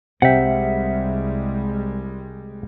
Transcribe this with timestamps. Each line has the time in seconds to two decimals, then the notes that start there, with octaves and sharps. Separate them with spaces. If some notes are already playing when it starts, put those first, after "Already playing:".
0.22 C2 C3 G3 G#3 E5 F#5 G5